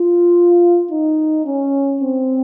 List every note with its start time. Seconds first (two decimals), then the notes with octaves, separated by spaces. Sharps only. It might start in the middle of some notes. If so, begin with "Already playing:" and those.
Already playing: F4
0.91 D#4
1.46 C#4
2.01 C4